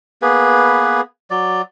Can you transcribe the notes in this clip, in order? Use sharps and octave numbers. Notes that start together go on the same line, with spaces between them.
A#3 B3 G#4 B4
F#3 D5